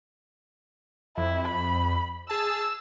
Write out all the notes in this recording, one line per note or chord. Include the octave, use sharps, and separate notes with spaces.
F2 E4
B5
G#4 A5 E6